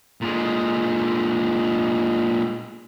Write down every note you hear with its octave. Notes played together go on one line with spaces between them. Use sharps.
A#2 G#3